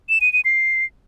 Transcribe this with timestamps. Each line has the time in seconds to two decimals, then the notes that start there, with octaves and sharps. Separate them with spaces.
0.09 E7
0.21 D#7
0.33 D#7
0.45 C7